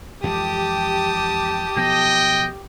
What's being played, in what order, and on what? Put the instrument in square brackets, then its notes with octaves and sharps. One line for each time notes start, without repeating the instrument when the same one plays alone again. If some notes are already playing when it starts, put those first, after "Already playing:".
[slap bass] F2 E3 G#3 [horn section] G4 [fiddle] A5 D#6
[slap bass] B1 F3 B3 [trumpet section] D#5 G5